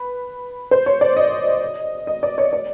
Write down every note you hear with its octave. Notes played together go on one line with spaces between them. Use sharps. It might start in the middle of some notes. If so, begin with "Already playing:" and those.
Already playing: B4
C5
C#5
D5
D#5
D#5
D5
C#5
D5